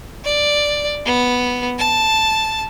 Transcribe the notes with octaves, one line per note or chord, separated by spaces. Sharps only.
D5
B3
A5